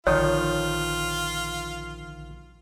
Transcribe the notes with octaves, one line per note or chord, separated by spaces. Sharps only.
A#1 D3 D#3 F3 F4 C#5